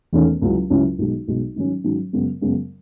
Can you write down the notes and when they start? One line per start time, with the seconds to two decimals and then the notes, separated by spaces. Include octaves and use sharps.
0.13 E1 E2 D#3 A3 C#4
0.42 C#2 C#3 F#3 C#4 E4
0.70 C#2 C#3 F#3 C#4 E4
0.98 B1 B2 G#3
1.28 B1 B2 G#3
1.56 G#2 D#3 F#3 C#4
1.84 G#2 D#3 F#3 C#4
2.13 F#2 C#3 G#3 B3
2.42 F#2 C#3 G#3 B3